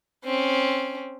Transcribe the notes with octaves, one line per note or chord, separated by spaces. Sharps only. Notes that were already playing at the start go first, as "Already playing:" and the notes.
C4 C#4